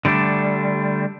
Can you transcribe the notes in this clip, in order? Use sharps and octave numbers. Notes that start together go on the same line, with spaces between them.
D3 G3 A3 D4